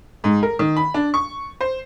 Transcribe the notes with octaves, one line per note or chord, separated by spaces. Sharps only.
G#2
A#4
D#3
B5
D4
C#6
C5